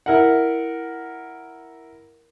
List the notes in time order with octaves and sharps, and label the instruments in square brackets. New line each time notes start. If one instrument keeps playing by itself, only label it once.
[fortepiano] E4 A#4 F#5